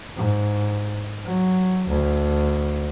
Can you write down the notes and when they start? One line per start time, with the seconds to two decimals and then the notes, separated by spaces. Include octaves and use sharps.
0.16 G#2
1.25 F#3
1.88 D2